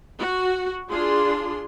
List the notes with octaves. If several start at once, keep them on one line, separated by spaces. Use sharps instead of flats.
F#4
D4 F4 G#4 C6